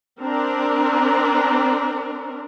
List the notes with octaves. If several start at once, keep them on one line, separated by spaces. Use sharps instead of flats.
C4 D4 A#4